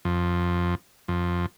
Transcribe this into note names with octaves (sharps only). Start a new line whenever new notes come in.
F2
F2